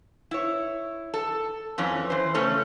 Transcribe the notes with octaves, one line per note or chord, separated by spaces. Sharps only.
E4 C#5
A4
F2 E3 C#4
E3 C5
C#3 A3 C#4 A4 C#5